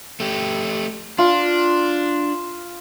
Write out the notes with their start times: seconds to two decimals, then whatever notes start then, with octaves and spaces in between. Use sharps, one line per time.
0.20 A3 G4
1.18 D4 F4